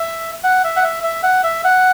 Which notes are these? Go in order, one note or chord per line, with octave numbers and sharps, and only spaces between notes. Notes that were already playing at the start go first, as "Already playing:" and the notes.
Already playing: E5
F#5
E5
F#5
E5
E5
F#5
E5
F#5